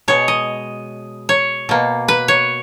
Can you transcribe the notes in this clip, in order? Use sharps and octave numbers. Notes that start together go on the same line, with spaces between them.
B2 G#3 C#5
D#5
C#5
B2 A#3
B4
C#5